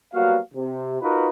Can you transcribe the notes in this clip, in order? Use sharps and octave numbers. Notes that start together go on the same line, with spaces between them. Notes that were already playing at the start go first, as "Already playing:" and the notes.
F#3 G3 A#3 B3 F#4 F5
C3
D#4 F4 F#4 A#4 B4